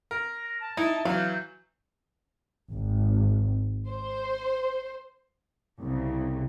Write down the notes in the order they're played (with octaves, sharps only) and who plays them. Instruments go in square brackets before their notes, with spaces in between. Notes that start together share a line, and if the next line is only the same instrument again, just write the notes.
[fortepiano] A#4 [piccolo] A#6
[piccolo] A5
[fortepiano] D#4 [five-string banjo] E4
[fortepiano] E3 F#3 [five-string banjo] F5 [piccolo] G6
[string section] G#1
C5
C2 C#3